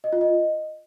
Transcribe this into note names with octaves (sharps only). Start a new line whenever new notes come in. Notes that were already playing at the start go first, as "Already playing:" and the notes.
D#5
F4
D#5